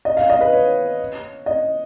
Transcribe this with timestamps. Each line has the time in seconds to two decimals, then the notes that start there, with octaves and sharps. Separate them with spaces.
0.05 D#5
0.17 F5
0.30 D#5
0.41 B4
0.52 C#5
1.46 D#5